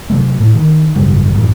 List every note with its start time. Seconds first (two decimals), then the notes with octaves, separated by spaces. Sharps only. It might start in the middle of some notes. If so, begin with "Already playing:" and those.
0.10 C3 F#3 A3
0.40 A2
0.55 D#3
0.96 G#1 F#2 C#3 G3
1.34 A1 F#2 E3